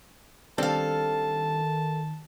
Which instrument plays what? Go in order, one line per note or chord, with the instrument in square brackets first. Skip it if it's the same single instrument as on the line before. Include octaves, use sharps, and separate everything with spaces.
[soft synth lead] D#3 [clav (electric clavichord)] G3 C4 D4 [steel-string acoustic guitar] A4 F5 [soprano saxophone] A5